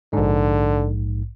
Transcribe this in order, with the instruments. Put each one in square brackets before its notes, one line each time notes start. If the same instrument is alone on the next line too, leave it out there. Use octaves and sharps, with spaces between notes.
[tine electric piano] A#1 G#2 [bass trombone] D3